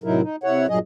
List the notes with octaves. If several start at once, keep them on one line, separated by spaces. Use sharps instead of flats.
A2 C3 F#3 D#4 E4 A#4
D#4
C3 E4 C#5 F#5
G2 A#2 F#3 G#4 D#5